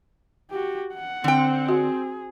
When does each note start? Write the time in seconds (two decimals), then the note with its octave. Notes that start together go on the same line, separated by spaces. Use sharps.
0.51 F#4 G4
0.94 F#5
1.24 D3 C4 G5
1.69 F#4 G#4